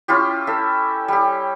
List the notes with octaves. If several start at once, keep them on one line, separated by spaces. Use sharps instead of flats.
C#4 E4 F4 G4
A4 E5
G3 G4